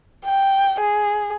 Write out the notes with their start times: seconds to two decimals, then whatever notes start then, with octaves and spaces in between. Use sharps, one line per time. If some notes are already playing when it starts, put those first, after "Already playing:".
0.25 G5
0.80 G#4